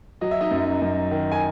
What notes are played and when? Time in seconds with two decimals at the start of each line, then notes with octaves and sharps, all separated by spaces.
0.21 F#3 D#5
0.31 E5
0.41 D#4 D#5
0.51 F#2
0.82 F#2
1.11 D#3
1.32 G#5